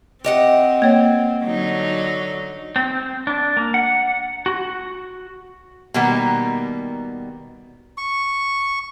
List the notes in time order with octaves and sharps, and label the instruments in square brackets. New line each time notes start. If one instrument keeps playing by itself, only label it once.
[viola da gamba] C4 [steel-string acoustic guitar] G4 D#5 F#5
[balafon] A#3 C#5
[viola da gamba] D3 F#3 D#4
[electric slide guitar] C4
D4
A#3
F#5
F#4
[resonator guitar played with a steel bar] B2 D#3 G3 A#3 B3
[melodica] C#6